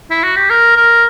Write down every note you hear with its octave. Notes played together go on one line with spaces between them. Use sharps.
E4
F#4
G4
A#4
A#4